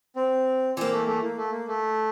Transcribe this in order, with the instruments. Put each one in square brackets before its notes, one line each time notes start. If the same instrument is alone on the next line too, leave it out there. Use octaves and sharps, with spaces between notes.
[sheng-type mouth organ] C4
[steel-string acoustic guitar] E3 G3 A#3 [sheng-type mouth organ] C4
[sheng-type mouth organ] A3
A3
A#3
A3
A#3
A3